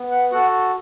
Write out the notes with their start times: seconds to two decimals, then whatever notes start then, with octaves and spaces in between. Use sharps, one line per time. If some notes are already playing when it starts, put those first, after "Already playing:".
Already playing: B3
0.11 F#5
0.31 F#4 A4 F#5